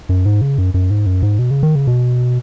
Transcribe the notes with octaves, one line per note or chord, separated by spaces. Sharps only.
F#2
G#2
C#3
F#2
F#2
G#2
F#2
G#2
B2
C#3
D#3
C#3
B2